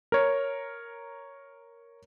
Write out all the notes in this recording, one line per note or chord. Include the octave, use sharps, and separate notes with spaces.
A#4 C#5